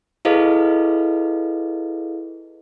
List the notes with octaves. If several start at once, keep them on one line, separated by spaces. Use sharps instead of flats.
E4 G#4 A4 B4 D#5 F5